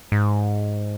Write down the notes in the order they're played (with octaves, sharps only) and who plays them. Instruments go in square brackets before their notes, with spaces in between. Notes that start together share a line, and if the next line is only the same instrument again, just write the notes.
[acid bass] G#2